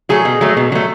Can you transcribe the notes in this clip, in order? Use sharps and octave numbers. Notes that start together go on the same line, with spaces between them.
F#3 A3 G#4
B2
F#3 A3
B2
F#3 A3